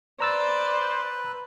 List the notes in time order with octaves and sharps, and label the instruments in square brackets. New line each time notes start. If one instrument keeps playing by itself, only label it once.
[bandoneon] B4 [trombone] C5 [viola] D5 [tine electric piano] A#5 E6 A6